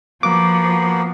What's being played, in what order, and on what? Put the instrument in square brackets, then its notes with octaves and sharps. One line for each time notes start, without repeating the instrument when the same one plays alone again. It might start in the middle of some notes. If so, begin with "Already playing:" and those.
[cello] F3 [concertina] A#3 B3 F#4 [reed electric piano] D6